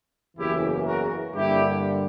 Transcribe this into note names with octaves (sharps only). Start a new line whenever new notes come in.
F#1 E2 C#3 E3 E4 G4
F#4 A#4
G2 D3 G3 A#3 E4 G4